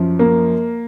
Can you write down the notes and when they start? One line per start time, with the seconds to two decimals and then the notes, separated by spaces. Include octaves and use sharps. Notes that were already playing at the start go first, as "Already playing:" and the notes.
Already playing: F#2 F3
0.19 A#3